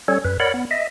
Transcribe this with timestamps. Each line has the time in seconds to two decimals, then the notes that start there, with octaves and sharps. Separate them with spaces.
0.08 G3 C#4 A4 C#5
0.25 F#2 B4
0.40 A#4 C#5 D5 F#5 B5
0.54 B3
0.71 D#5 E5